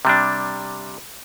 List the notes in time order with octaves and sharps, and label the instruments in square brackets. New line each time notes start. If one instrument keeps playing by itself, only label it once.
[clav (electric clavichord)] C3 G3 D4